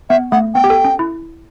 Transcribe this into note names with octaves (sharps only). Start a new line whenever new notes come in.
B3 E5
A3 F#5
B3 G5
G4
A4
C#4
E4